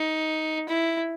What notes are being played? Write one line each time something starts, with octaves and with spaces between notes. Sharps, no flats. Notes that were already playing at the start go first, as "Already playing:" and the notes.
Already playing: D#4
E4